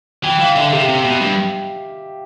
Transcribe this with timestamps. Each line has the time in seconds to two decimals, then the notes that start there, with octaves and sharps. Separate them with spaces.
0.24 E3 G5
0.39 E3 F5
0.56 D3 E5
0.73 C3 G4
0.89 C3
1.05 B2
1.21 G2